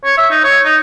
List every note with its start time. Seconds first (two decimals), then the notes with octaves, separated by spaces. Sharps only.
0.05 C#5
0.18 E5
0.31 D#4
0.44 C#5
0.65 D#4